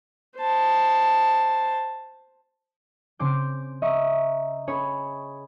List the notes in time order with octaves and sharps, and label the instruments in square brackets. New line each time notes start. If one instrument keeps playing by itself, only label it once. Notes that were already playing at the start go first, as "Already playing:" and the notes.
[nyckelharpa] C5 A5
[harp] C#3 C4 C6 D6 G6
D#5 E5 A#5 C#6 D#6
C#4 G#4 C#5 B5